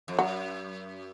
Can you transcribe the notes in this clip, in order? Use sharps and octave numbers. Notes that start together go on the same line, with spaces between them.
F2
F#2 F#3